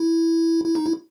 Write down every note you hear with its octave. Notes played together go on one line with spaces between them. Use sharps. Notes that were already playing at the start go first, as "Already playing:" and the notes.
Already playing: E4
E4
D#4
E4